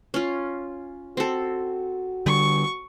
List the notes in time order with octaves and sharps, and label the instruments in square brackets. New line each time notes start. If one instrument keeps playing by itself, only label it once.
[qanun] C#4 F4
[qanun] C4 A4 [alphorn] F#4
[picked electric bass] D3 G3 [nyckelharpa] C#6